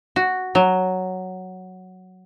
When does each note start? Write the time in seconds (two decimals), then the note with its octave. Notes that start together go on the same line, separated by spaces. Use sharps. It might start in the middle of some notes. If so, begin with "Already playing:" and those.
0.16 F#4
0.55 F#3